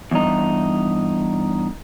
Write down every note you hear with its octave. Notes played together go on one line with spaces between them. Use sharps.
E2 G2 D#4